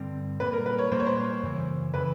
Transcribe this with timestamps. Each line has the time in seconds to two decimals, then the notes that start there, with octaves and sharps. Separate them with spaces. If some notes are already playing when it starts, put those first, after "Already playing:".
Already playing: G2 D3 G3 C4
0.40 A#2 G3 A#3 B4
0.53 A#4
0.66 B4
0.79 C#5
0.91 A#2 G3 A#3 C5
1.00 C#5
1.07 C5
1.43 F#2 C#3 E3
1.94 C#3 E3 B4